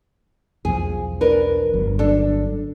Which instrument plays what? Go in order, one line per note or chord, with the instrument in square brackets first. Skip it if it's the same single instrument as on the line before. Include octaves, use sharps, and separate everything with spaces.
[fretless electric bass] B1 E2 F3 [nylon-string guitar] G#4
[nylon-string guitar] D4 A#4 B4
[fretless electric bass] G1 F#3
[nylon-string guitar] D4 A4